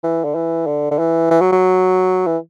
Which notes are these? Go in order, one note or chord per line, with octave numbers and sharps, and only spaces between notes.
E3
D3
E3
D3
D3
E3
E3
F#3
F#3
E3